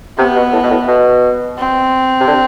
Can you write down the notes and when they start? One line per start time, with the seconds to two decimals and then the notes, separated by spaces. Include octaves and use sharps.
0.18 C3 B3
0.36 B2
0.53 A2
0.64 B2
0.71 A2
0.87 B2
1.58 C4
2.20 C3
2.28 D3